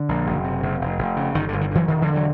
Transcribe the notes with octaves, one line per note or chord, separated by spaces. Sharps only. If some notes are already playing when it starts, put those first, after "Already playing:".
Already playing: D3
A#1
F#1
C3
F#1
F1
F1
C#3
G1 D#3
G1 D3
D#3
D3 E3 F#3
E1 D#3
D#3 F3
D3
E3 F#3